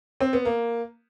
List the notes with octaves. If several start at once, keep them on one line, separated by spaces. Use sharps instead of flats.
C4
B3
A#3